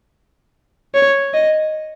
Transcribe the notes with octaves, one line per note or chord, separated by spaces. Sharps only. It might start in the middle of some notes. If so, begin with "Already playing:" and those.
C#5
D#5